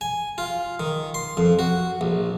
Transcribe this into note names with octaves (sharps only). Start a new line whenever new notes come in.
G#5
F4
D#3
C6
F2
F#4
A#1